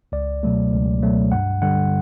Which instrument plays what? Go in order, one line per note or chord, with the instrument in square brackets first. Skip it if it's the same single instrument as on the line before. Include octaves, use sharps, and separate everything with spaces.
[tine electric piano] C#2 D5
B2 F#3 A3
C#2
B2 F#3 A3
G2 F#5
D3 G3 F#5